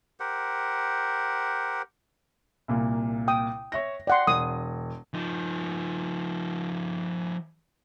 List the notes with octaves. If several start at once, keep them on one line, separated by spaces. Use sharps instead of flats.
G4 A#4 C5 F#5
C2 A#2 A#3
G5 D#6
C#5 E5 A#6
D5 F#5 G5 C6
E1 D#6
F3 D#4